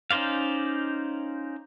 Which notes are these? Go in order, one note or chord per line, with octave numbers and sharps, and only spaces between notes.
C#4 D#4 C5 D5 F5